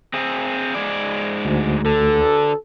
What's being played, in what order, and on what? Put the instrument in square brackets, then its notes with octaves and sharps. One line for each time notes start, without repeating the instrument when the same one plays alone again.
[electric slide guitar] C4 G#4
G#2 G#4 D5
[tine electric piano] D2
[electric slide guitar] D3 [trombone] A4